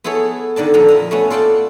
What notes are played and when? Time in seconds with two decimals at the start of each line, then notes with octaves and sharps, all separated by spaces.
0.04 B3 E4 G#4 A4 C#5
0.56 D3 D#3 D5 A5
0.74 F2 A#2 D3 A4 A#5
0.88 E4 D#5 A#5
1.11 A3 B3 C#4
1.30 F4 A4 D5 G5 A5